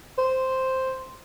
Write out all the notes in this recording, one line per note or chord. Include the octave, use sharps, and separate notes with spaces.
C5